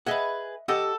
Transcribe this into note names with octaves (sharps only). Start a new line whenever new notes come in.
G#4 B4 D#5 E5 F#5
G4 A4 D#5 F#5